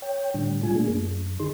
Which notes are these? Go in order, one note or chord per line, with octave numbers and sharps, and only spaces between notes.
C#5 G5
A2 D3 G3 D4
A#2 G3 G#3 F4 G#5
A3 A#3 D4 G#4
F#2
D3 D#3 D#4 G#4 C6